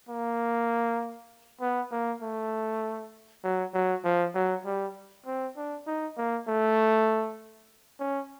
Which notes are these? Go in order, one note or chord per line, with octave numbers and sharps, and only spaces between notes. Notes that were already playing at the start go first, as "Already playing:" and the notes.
A#3
B3
A#3
A3
F#3
F#3
F3
F#3
G3
C4
D4
D#4
A#3
A3
C#4